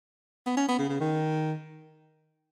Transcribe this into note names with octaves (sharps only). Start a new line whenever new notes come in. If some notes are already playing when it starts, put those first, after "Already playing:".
B3
C#4
B3
C#3
C#3
D#3